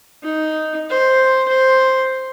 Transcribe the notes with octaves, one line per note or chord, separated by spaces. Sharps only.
D#4
C5
C5